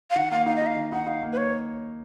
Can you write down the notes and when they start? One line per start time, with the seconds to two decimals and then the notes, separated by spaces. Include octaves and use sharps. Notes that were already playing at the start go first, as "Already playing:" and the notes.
0.10 F5
0.16 D#3 F#5
0.31 A#3 F5
0.46 D#4 F5
0.56 D#5
0.62 D#4 F5
0.76 D#3
0.92 D#4 F#5
1.07 D#4 F5
1.23 A#3
1.32 B4
1.37 C#5